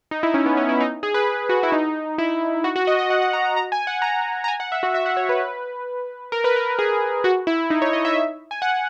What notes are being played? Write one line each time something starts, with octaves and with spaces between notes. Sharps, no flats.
D#4
E4
C#4
B3
C#4
E4
D#4
G#4
B4
F#4
E4
D#4
E4
F#4
F#4
D#5
D#5
F#5
F#5
A#5
A#5
A#5
G#5
F#5
A#5
A#5
G#5
F#5
E5
F#4
E5
F#5
C#5
B4
A#4
B4
A#4
G#4
F#4
E4
D#4
C#5
D#5
E5
G#5
F#5